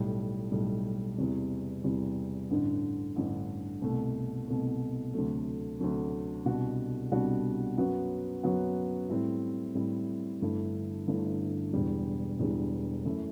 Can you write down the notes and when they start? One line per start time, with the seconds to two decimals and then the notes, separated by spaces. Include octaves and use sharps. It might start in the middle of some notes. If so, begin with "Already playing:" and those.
Already playing: B1 A2 G3
0.52 B1 A2 G3
1.18 E2 C3 G3
1.84 E2 C3 G3
2.50 A1 G2 D3
3.16 A1 G2 D3
3.82 C2 B2 A3
4.48 C2 B2 A3
5.14 D2 C3 F#3 A3
5.80 D2 C3 F#3 A3
6.45 C2 B2 G3 D4 F#4
7.11 C2 B2 G3 D4 F#4
7.78 F#2 F#3 B3 F#4
8.43 F#2 F#3 B3 F#4
9.09 A2 G3 C4 E4
9.75 A2 G3 C4 E4
10.42 G1 G2 D3 A3 E4
11.07 G1 G2 D3 A3 E4
11.73 E1 E2 D3 G3
12.39 E1 E2 D3 G3
13.05 F#2 E3 A3 E4